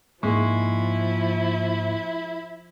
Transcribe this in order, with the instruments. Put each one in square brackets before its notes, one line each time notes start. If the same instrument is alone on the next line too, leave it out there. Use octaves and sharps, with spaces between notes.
[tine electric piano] G#2 A#3 C#6 [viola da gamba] F3 [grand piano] G#3 [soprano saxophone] E4